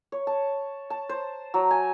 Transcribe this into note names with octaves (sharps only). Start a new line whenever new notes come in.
C#5
A5
A5
C5
F#3
G#5